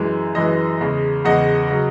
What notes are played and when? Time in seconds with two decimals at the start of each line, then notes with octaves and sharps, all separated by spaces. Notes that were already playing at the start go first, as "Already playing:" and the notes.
Already playing: F#2 E3 G#3
0.35 F#2 E3 G#3 D#5
0.81 E2 C#3 G#3
1.25 E2 C#3 G#3 D#5 F#5
1.70 C#3 F#3